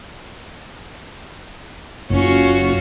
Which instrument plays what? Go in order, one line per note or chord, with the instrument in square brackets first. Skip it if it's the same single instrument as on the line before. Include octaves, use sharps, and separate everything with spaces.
[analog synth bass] F#1 [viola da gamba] C#4 F4 F#4